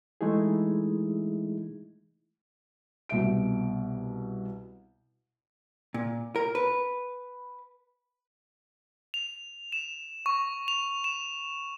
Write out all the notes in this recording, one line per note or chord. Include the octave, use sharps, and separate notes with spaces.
E3 G#3 A3 D#4 E4 G#4
C2 B2 E5 D7
A#2
A#4
B4
F7
E7
C#6
F7
E7